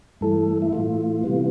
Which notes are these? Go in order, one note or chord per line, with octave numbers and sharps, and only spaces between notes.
G2 E3 A3 A4
E4
A2 E3 A3 F4
C3 E3 G3 B3